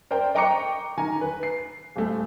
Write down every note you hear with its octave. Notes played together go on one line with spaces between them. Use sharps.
A#4 C5 D5 G5
D#5 G5 A#5 C#6 D6 C#7
D#3 G#5 A#5
B4
C7
D#1 A3